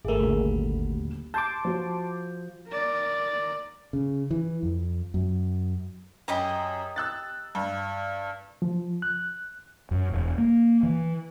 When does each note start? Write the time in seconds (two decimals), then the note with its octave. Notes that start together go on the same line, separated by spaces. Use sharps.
0.05 G#1 A3 G#4 A#4
0.20 D#1 D2 G3 B5
1.34 A5 C6 D6 G6
1.65 F3 F#4
2.68 A#4 D5
3.93 C#3
4.31 E3
4.63 F2
5.14 F#2
6.28 F#2 G4 D#5 A#5
6.96 E6 F#6 A6
7.55 G2
8.62 F3
9.02 F#6
9.91 F#2
10.12 E1
10.38 A#3
10.83 E3